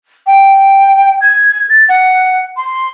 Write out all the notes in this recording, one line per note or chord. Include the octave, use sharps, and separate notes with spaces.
G5
G#6
A6
F#5
C6